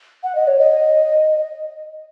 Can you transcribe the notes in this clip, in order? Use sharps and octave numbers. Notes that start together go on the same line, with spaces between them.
F#5
D#5
C#5
D#5